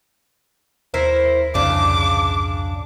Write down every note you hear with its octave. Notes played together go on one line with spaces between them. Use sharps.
D#2 E4 A#4 C5
C2 F2 G#2 C#3 D4 D6